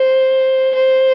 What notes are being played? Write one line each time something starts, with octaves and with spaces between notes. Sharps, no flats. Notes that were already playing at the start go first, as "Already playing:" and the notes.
Already playing: C5
C5